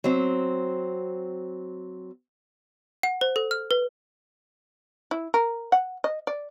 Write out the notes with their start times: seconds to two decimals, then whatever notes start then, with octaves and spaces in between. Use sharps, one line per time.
0.04 F#3 C4
3.03 F#5
3.21 C5
3.36 A4
3.51 F6
3.71 B4
5.11 E4
5.34 A#4
5.72 F#5
6.04 D#5
6.27 D5